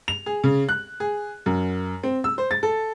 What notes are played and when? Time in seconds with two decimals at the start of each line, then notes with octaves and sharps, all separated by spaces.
0.08 F7
0.26 G#4
0.44 C#3
0.69 F#6
1.00 G#4
1.46 F#2
2.04 C4
2.24 E6
2.38 C5
2.51 A6
2.63 A4